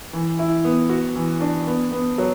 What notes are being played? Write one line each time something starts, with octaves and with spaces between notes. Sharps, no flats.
E3
E4
B3
F#4
E3
D4
B3
B3
F#3